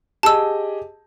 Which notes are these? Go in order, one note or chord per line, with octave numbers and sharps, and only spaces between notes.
G4 G#4 D#5 A5 E6